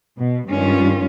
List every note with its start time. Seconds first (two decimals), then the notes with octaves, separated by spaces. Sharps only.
0.19 B2
0.49 G2 D#3 G#3 C#4 F4